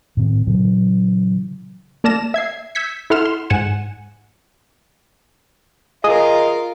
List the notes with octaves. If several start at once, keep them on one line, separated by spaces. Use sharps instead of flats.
A2 D#3 C4
A#2 C#3 E3 F#3
A#3 D5 A5 F6 A#6 E7
E5 G#6 C7
E6 G6 G#6 B6 C#7
E4 A4 F#5 C6 F6 E7
C6
G#2 F#5 G#5 C#7 E7
F4 G#4 A#4 D#5 D#6